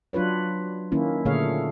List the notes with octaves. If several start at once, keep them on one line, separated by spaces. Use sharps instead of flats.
F#3 D4 F4 B4 C#5
D#3 A#3 C#4 E4
A#2 D3 A3 G#4 C#5 F5